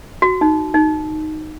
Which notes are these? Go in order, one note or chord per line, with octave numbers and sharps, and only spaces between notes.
F#4
D#4
D#4